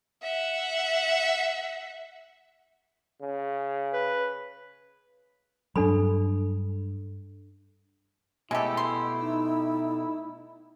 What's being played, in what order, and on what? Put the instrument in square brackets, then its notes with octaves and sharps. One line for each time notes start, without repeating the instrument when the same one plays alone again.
[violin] E5 F#5
[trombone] C#3
[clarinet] B4
[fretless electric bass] G2 F#3 [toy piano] D4 A4 B5
[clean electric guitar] B2 A3 G4 [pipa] G#3 A4 [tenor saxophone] E4
[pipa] C6
[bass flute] D#4